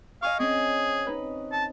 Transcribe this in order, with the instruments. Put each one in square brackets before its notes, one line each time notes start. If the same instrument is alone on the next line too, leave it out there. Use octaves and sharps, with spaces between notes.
[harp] D#5 G#5 C#6 [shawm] F5
[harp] C4 C#4 [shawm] G#4
[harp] D#4 B4
[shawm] A5